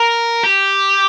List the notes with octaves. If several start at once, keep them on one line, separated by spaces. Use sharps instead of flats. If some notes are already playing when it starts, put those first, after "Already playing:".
Already playing: A#4
G4